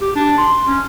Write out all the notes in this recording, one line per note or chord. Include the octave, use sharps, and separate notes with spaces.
G4
D4
C6
C#4